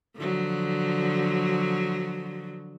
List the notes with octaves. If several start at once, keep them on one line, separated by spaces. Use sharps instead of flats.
D3 F3 F#3